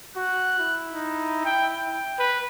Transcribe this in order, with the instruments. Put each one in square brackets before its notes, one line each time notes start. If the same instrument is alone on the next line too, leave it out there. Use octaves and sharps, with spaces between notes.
[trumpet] F#4 [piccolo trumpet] F#6
[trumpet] E4
[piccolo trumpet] D#4
G5
G5
[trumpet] B4